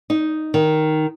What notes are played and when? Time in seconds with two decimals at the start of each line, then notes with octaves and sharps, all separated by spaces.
0.10 D#4
0.54 D#3